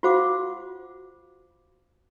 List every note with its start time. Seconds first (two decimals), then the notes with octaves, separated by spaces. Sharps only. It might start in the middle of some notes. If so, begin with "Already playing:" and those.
0.03 F4 F#4 C5 F5 F#5 D6